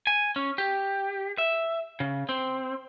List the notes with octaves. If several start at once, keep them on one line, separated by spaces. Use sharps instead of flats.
G#5
C#4
G4
E5
C#3
C4